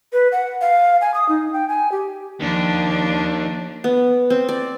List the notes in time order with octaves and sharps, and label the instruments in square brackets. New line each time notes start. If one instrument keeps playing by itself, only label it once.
[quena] B4
F#5
F5
G#5
D#6
D#4
G5
G#5
G4
[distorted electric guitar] D#2 [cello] F3 D4
[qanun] B3
C4
D5